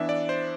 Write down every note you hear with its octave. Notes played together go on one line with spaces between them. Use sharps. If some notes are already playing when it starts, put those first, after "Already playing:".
Already playing: E3 B3 D4 E5
D5
C5